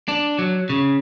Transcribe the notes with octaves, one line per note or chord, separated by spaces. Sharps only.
D4
F#3
C#3